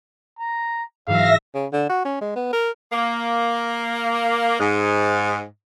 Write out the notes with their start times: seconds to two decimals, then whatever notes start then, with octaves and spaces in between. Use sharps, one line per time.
0.39 A#5
1.07 G#2 E3 F#3 E5 F5 A#6
1.54 C#3
1.73 D3
1.90 F#4
2.05 C#4
2.21 G#3
2.36 B3
2.53 A#4
2.92 A#3
4.60 G#2